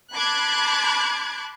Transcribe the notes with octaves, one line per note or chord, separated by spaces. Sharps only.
A5 B5 C6 D6 F#6 G#6